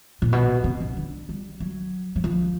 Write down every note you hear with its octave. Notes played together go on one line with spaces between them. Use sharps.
A#2
B2
C3
C#3
D3
G3
F#3
F#3
F3